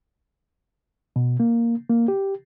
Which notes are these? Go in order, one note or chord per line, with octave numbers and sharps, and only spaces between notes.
B2
A#3
A#3
G4